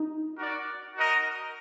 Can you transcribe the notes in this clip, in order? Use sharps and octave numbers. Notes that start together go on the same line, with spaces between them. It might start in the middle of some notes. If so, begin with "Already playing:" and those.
Already playing: D#4
F#4 A#4 D5 F#5
D#4 F#4 A#4 D#5